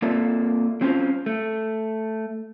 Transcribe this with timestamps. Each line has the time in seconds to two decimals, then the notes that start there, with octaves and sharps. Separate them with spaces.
0.02 A#3 C4 F4 A4 D5 E5
0.81 F#3 C4 C#4 F4 C5
1.26 A3